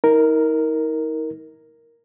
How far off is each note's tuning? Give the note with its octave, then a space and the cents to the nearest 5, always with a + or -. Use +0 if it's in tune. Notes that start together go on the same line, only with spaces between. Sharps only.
D#4 +40 A#4 +0